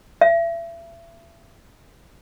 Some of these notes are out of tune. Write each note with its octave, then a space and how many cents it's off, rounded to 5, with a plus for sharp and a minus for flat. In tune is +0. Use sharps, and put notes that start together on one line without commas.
E5 +35